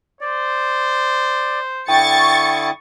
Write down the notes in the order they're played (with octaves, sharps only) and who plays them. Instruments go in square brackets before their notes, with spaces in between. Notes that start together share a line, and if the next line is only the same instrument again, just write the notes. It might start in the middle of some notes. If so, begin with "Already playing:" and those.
[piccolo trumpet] C5 [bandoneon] D5
[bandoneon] D3 E4 D#6 [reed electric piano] G5 [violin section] C#6 A6 C#7